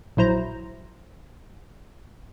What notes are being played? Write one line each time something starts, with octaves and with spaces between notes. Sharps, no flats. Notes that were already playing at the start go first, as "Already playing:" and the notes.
A#1 F#3 E4 C5 A#5